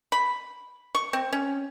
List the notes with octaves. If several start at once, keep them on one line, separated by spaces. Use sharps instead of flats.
B5
C#6
C4
C#4